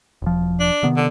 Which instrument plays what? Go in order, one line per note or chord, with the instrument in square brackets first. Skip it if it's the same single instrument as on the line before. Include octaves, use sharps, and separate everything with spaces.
[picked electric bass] E1 F3
[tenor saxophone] D4
[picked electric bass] C3 D#3 B3
[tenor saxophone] D3